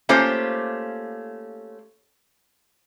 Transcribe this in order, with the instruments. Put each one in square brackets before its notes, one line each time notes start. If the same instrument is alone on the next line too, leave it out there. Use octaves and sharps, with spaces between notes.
[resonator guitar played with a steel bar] A3 A#3 C#4 F4 G4 C5